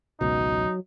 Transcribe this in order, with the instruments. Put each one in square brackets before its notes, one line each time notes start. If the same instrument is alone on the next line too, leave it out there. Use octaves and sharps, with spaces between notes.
[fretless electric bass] G#1 C#2 B2 [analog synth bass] F#3 [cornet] D#4